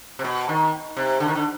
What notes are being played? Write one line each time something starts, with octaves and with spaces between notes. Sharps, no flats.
C3
B2
D#3
C3
D3
D#3
D3